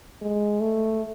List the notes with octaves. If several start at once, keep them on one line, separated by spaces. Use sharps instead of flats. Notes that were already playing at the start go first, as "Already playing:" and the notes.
G#3
A3